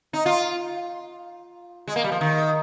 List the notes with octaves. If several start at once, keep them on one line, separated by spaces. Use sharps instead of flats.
D#4
F4
G#3
A#3
G3
F3
D#3